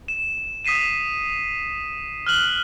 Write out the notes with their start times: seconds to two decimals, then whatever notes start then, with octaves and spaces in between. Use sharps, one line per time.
0.08 E7
0.65 D#6 B6 C7 D#7 E7
2.27 F6 F#6 F#7 G7